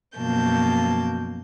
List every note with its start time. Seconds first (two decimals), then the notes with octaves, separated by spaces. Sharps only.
0.17 F#2 B2 F3 A#3 A5 G6